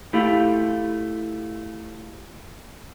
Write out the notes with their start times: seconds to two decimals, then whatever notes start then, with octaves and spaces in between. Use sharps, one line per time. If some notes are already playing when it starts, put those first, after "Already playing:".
0.13 A3 E4 F4 G4